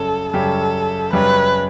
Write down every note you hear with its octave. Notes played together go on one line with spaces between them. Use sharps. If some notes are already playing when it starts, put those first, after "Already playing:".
Already playing: F#2 C#3 G3 C#4 A4
F#2 C#3 G3 C#4 G4 A4
F#2 C#3 G3 C#4 G4 B4